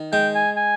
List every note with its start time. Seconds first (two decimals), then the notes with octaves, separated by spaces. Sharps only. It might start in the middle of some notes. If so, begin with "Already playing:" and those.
Already playing: D#3
0.13 G#3 G5
0.35 G#5
0.56 G#5